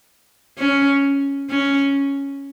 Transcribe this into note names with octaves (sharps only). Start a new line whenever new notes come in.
C#4
C#4